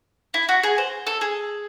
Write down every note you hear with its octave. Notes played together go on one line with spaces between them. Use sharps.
E4
F#4
G#4
C5
A4
G#4